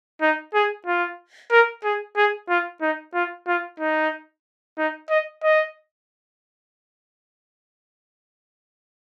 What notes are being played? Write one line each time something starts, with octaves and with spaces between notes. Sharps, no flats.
D#4
G#4
F4
A#4
G#4
G#4
F4
D#4
F4
F4
D#4
D#4
D#5
D#5